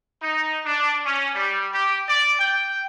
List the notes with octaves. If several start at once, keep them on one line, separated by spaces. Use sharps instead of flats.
D#4
D4
C#4
G3
G4
D5
G5